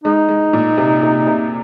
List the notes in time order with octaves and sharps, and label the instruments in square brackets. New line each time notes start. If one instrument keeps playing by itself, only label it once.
[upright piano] G#3 [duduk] D#4
[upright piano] G#3
A#2
C3
C3
C3